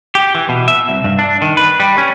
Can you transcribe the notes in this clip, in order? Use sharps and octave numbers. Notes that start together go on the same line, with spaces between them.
G4
E3
B2
E5
C2
G2
D4
D#3
B4
G3
C#4